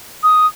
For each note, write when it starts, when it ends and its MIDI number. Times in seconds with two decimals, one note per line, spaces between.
0.23 0.47 87